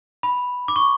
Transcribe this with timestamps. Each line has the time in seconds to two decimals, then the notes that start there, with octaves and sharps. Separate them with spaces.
0.23 B5
0.68 D6
0.76 C#6